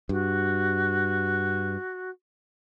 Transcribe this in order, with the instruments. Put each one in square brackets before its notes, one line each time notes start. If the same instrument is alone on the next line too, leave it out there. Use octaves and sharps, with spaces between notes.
[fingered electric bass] G2 [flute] F#4